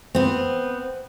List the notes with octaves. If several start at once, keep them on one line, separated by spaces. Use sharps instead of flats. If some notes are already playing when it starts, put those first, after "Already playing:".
B3 C4